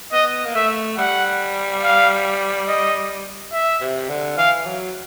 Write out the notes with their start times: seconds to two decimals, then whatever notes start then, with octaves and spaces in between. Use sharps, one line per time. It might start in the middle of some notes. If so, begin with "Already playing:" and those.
0.13 B3 D#5
0.45 A#3
0.55 A3 E5
0.98 G3 F#5
1.83 F5
2.68 D#5
3.53 E5
3.81 C3
4.09 D3
4.38 E3 F5
4.66 F#3